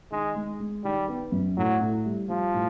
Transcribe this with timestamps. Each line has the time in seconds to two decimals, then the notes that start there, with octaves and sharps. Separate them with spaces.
0.11 D#3 G#3
0.35 G#3
0.60 G#3
0.84 D#3 G3
1.08 B3
1.32 F#2
1.57 A2 F#3
1.81 A2
2.05 G3
2.29 F3 G3
2.54 A2